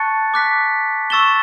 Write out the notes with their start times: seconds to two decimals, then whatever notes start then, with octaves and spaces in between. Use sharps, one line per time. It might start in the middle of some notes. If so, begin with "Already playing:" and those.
Already playing: A5 C#6 F#6 A6 C#7
0.34 D6 F#6 B6
1.10 C#6 E6 A6 E7 G7